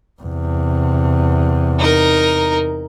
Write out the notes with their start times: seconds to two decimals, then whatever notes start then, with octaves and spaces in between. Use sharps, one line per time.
0.22 E2 C3
1.79 D#4 A#4